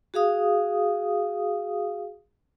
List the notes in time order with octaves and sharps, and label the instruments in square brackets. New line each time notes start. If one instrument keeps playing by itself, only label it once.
[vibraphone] F#4 G#4 F5 D#6